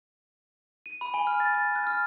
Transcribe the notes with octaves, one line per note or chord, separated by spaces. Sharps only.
D#7
B5
G#5
F6
A6
A6
F#6
F6